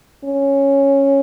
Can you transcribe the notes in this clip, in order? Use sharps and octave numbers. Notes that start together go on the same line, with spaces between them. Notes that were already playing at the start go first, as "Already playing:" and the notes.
C#4